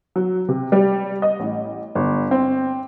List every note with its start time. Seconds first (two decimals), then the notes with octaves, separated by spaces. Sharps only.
0.16 F#3
0.49 C3
0.72 G3
1.22 D#5
1.40 A1
1.95 G1
2.31 C4